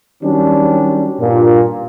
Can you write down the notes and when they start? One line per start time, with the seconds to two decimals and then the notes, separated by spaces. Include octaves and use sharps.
0.23 D#3 F#3 G3 C#4 D4
1.20 G2 A#2